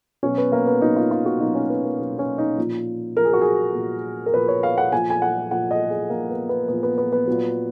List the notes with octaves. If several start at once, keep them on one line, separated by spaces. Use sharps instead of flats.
B2 F#3 C#4
B3
A#3
B3
B2 F#3 D#4
F4
F4
F#4
B2 F#3 D#4
C#4
B3
A#3
B2 F#3
C#4
D#4
A#2 F3
A#2 F3 A#4
G#4
F#4
G#4
A#2 F3
A#4
A#2 F3 B4
C#5
F5
F#5
A#2 F3 G#5
G#5
F#5
A#2 F3 F#5
D#5
G#4
A#2 F3 A#3
B3
B3
A#2 F3 B3
B3
B3
B3
A#2 F#3